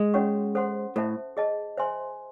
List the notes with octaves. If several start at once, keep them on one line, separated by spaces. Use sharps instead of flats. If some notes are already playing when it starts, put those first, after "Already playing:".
Already playing: G#3
C#4 F#4 C#5 F#5 C#6
A4 C5 F#5 C6
A2 A4 C5 E5 A5
G#4 D#5 A5
C5 E5 G#5 C6